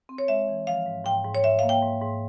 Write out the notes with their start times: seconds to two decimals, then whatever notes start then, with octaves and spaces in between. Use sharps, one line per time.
0.09 C4
0.18 C#5
0.28 G#3 E5
0.49 E3
0.67 F3 F5
0.86 G#2
1.05 G#2 G5
1.24 G#2
1.35 C#5
1.44 G#2 E5
1.59 A#3 F5
1.69 G5
1.82 G#2
2.01 G#2